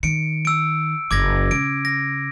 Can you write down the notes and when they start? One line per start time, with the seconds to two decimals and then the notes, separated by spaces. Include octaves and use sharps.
0.03 D#3 C#7 D7
0.45 E6 D7
1.11 F#1 D6 G#6 A#6
1.51 C#3 D7
1.85 A#6